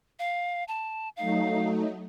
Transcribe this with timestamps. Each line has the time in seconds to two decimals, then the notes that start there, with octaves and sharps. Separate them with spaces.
0.19 F5
0.68 A5
1.17 F#3 A3 D#4 F5